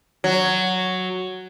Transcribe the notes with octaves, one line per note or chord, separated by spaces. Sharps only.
F#3